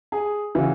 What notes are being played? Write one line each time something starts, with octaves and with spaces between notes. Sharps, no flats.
G#4
C#3 E3 F#4